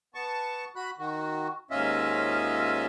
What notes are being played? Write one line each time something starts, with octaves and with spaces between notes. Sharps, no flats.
B3 A5 C#6
F#4 B5 F#6
D#3 F#4
D#2 G#2 C#4 F4 D#5 E5